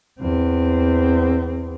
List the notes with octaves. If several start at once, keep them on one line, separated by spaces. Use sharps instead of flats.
E2 C4